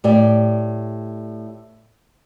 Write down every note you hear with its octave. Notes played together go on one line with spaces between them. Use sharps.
A2 G4 D5